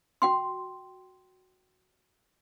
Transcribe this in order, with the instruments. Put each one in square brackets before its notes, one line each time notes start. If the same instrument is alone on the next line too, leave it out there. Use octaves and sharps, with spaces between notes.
[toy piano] F#4 G5 C6